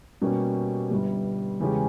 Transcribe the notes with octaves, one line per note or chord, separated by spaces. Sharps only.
B2 G3 A#3 C#4 G4
G1 G2 G3
E2 C#3 G#3 C#4 G4